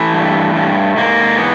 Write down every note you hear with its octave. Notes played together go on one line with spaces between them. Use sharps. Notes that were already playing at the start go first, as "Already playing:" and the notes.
Already playing: E3 A3
G2
G2
G#2 A#3
E3 B3